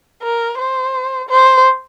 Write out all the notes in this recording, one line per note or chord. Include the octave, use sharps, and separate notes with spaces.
A#4
C5
C5